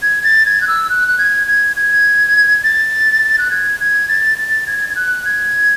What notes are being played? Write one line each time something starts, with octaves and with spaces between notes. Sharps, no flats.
G#6
A6
G#6
F#6
E6
F#6
F#6
G#6
G#6
G#6
A6
F#6
G#6
G#6
A6
A6
G#6
G#6
F#6
G#6